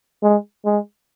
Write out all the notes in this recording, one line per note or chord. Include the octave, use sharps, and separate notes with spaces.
G#3
G#3